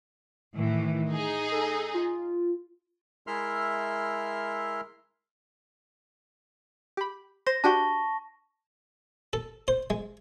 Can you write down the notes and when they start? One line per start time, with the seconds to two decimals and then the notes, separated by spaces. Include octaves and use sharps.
0.56 A2 D#3 E3
1.10 D#4 G#4
1.52 A4
1.94 F4
3.27 G#3 E4 A#4 E5 C6 F6
6.97 G4 B5
7.47 C5 A#6
7.64 D4 F#4 G4 A5 C#6
9.33 A4
9.68 C5
9.90 G#3